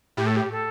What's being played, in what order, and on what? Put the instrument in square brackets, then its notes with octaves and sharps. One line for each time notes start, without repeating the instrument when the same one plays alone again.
[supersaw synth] A2 [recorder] G4
[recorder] A4
G4
A4